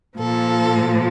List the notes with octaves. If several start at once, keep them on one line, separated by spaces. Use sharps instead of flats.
A#2 F3 A4